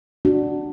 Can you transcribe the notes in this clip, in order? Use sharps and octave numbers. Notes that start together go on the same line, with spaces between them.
D4 F#4